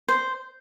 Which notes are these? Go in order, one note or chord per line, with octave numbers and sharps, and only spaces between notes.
C5